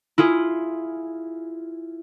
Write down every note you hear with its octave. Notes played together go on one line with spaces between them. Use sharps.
E4 F4 G#4